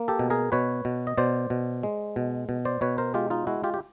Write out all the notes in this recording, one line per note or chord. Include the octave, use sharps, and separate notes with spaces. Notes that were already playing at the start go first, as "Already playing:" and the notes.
Already playing: A#3
G4 A4
B2
G#4 A#4
B2 B4 C#5
B2
D#5
B2 C5 D5
B2
G#3
B2
B2
C5 D5
B2 B4 C#5
A#4 C5
G#3 F4 G4
D#4 F4
G#3 E4 F#4
F4 G4
G4